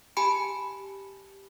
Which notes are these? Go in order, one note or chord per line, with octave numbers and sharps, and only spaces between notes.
G4 G#5 A5 B5 C#7